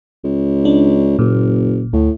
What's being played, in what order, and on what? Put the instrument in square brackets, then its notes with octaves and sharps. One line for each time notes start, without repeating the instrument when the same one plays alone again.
[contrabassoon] C#2
[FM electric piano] D4
[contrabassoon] F#1 [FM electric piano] A#2
[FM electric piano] D2 [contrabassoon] A2